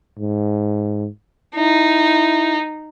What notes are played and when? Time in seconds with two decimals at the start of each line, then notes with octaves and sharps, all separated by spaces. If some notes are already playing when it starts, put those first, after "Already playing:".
0.18 G#2
1.56 D#4 E4